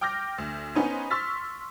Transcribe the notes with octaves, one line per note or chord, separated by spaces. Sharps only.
G5 D6 F6 G6 A#6
D2
B3 C#4 D#4 C5 G#5
C6 C#6 E6 F6 A6 B6